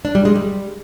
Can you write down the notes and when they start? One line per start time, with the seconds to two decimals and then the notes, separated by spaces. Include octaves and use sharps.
0.05 D4
0.15 G3
0.25 G#3
0.35 G3